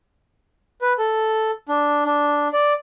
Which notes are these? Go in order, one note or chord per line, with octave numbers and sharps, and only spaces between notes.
B4
A4
D4
D4
D5